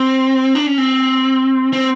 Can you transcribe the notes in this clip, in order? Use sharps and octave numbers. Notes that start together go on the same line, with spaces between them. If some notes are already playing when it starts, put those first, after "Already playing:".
Already playing: C4
D4
C#4
C4
C4